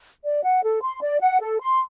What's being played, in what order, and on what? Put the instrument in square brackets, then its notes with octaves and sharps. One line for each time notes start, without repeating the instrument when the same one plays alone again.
[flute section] D5
F#5
A4
C6
D5
F#5
A4
C6